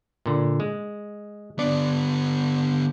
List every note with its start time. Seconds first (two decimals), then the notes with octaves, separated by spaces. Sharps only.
0.26 A#2 D3
0.60 G#3
1.59 D3 B3 D4 D5